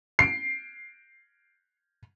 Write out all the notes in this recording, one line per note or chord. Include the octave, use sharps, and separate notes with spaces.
C7 D7